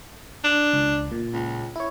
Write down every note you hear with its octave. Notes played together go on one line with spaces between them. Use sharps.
D4
C#2
A#2
C#2
E4 C#5